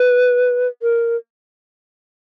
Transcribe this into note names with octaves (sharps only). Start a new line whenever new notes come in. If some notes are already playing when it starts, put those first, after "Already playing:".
Already playing: B4
A#4